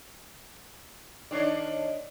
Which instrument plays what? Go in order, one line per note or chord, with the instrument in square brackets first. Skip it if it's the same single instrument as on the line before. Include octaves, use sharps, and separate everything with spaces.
[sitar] D#3 D4 C#5 [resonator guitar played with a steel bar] D5